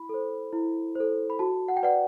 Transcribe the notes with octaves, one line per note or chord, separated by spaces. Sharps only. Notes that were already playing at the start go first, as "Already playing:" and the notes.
Already playing: E4 B5
A4 C5
E4
A4 C5
B5
F#4 A5
F#5
G5
B4 D5 F#5